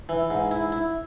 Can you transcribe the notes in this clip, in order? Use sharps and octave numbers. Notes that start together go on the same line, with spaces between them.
E3
G#2
E4
E4